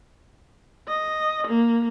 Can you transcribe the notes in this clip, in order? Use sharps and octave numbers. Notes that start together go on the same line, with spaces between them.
D#5
A#3